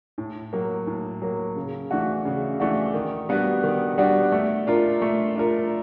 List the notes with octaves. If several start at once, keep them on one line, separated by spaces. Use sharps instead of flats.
A2
F#3 A#3
A2
F#3 A#3
C#3
E3 A3 D4 F#4
C#3
E3 A3 D4 F#4
D#3
G3 B3 D4 F#4
D#3
G3 B3 D4 F#4
A3
D4 F4 A#4
A3
D4 F4 A#4